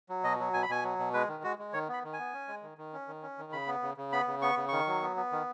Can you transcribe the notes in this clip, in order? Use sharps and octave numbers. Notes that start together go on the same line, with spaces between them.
F#3
B2 D#5
F#3
B2 G#5
B5
B2 G#5
F#3
B2
G#3 B4
D#3
G#3 F#4
G#3
D#3 C#5
B3
B5
D#3
G#5
B3
C#4
G#3
D#3
D#3
C#4
D#3
C#4
D#3
C#3 B5
B3
C#3
C#3
B3 B5
C#3
B3 C#6
C#3
D#3 C#6
F#3
B3
B3
D#3